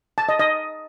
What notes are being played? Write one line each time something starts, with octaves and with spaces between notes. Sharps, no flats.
A5
D#5
D#5